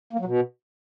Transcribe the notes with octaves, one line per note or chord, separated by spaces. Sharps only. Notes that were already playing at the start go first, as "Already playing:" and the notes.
A#3
F#3
B2